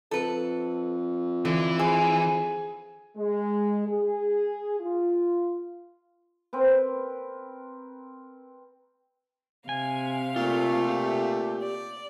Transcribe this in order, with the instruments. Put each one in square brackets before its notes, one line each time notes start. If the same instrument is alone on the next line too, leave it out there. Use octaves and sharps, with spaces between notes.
[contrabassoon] F2 [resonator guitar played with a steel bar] A4 B4
[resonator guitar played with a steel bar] D3 [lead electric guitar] E3
[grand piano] G#4 G#5 [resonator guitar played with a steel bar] C5
[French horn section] G#3
G#4
F4
[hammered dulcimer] C4 A#4 B4
[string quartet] C3 F5 [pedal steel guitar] G#5
[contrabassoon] A#2 [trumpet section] A3 [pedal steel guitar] F4
[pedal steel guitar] G4
[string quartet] D5